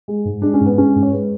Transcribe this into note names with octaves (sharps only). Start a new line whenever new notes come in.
G#3
G#2
G#3 D4
C#4
G#2
B3
G#3 C#4
G#2
C#5
G#3 B4